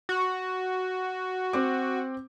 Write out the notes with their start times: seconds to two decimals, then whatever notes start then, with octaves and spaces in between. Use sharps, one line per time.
0.09 F#4
1.53 C4 D6